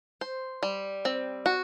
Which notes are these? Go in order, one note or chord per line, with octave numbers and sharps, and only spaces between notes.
C5
G3
C4
F#4